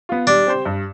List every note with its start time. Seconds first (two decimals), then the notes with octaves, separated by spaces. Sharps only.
0.09 B3 F4
0.27 G3 D4
0.47 C4 G4 C5
0.65 G2